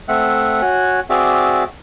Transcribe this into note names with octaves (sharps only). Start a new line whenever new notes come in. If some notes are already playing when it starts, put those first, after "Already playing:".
A3 C4 E5 F#5
F#4 C#5 G#5 F#6
C4 F#4 G#4 D5 E5 D6